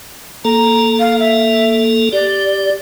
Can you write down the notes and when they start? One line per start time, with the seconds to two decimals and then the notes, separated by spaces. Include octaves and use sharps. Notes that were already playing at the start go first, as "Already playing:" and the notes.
0.45 A#3 A4 A#5
1.00 F5
1.20 E5
2.13 G4 D5